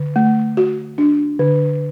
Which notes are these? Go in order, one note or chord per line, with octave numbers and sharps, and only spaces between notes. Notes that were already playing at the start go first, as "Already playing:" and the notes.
Already playing: D3
A3
F#4
D4
D3